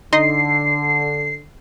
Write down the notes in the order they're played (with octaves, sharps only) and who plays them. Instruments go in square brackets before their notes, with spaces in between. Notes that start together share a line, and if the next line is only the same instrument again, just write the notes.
[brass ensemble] D3 [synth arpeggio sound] D#4 D#5 C6 [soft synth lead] C7